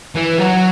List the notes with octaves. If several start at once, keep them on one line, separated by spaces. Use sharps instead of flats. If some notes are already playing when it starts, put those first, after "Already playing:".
E3
F#3